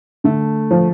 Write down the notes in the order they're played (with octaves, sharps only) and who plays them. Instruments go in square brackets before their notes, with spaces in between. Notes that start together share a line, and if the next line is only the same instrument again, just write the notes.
[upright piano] D3 [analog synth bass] A3
[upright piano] F3